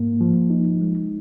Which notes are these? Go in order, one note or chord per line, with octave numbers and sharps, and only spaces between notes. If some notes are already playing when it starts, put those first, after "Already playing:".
Already playing: G#2 A#3
F3
D#4
G#3